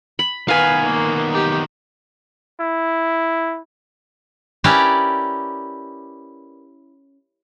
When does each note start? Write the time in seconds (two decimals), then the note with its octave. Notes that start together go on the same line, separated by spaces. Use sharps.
0.19 B5
0.48 D#3 B3 B4 F5 G#5
0.85 A#3
1.31 D#4 G4
2.60 E4
4.64 C#4 E4 G4 A#4 B4 D5